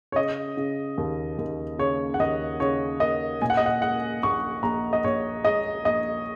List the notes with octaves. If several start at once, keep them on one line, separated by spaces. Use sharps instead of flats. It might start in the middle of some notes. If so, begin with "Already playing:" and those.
C#5
C#3 D#5
C#3
D#2
D#2
C#3 C#5
F#5
D#2 D#5
C#3 C#5
A#3 D#5
A#2 G#5
F#5
D#5
F#5
G#3 F#5
A#1 C#6
A#1 A#5
D#5
A#1 C#5
G#3 D#5
A#1 D#5